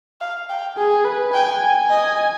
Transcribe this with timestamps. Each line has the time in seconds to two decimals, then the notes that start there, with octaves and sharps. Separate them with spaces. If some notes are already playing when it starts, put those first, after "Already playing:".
0.21 F5
0.49 G5
0.77 G#4 G#5
1.05 B4
1.34 G5 G#5
1.89 D#5 G#5